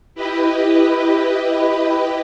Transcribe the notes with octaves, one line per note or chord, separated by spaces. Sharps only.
E4 G4 B4 D#5